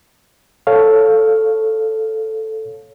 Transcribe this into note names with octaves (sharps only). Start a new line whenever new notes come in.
A4 C#5 F5